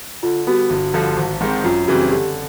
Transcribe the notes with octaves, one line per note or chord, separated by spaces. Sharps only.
D3 F4
G3 B3 F#4
G1
G2 D3 F3
G#1
G#2 D#3 G#3 C4
F#2 F4
C#3 E3 G3 C4 F#4
D3 G4